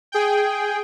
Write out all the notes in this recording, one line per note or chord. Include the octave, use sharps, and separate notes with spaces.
G#4 G5